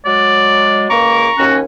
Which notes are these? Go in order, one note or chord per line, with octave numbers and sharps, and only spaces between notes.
F#3 G#3 D5
C#2 A#3 A#5 C#6 D6
D#2 C#4 F#4